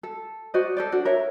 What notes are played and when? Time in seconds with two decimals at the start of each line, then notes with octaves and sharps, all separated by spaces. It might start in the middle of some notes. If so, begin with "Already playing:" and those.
0.03 A4
0.54 F#4 C5 D5 D#5
0.77 A4 C5 D5
0.92 D4 F#4
1.05 A#4 C#5 E5